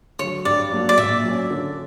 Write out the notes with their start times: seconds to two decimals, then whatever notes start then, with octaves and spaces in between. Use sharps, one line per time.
0.19 D3 F#3 C#5
0.45 G2 D5
0.72 F#3 A#3 D4 F#4
0.89 D5
0.98 A#2 E5
1.24 F#3 C#4
1.51 D3